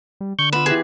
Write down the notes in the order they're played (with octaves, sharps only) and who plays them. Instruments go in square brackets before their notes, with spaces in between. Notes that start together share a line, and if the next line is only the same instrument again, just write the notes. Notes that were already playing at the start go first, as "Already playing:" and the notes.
[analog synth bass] G3
[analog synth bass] D3 [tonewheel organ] C#6 G6
[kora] B3 F4 [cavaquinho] B4 [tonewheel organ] E6
[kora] E3 G4 B4 [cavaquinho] G#4